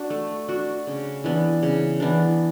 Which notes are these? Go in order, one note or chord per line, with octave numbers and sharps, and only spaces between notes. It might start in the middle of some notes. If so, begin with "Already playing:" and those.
Already playing: D4 F#4
A3
D4 F#4
C#3
E3 B3 D4
C#3
E3 B3 D4